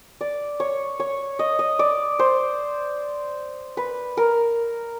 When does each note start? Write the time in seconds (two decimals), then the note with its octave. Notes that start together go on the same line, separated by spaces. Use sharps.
0.21 D5
0.60 C#5
1.00 C#5
1.39 D#5
1.59 D#5
1.79 D5
2.19 C5
3.77 B4
4.17 A#4